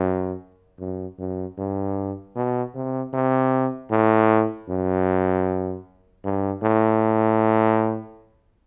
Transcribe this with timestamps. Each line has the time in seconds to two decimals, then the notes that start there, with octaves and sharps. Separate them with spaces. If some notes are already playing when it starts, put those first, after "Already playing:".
Already playing: F#2
0.80 F#2
1.19 F#2
1.58 G2
2.36 B2
2.75 C3
3.13 C3
3.91 A2
4.69 F#2
6.25 G2
6.63 A2